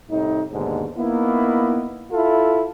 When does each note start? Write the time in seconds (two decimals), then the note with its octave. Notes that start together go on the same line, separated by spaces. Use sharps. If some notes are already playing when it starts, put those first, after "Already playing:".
0.10 C2 A2 D#4
0.52 D#2 G#2 B2 D3
0.97 A#3 B3 D#4 E4
2.11 E4 F4 A4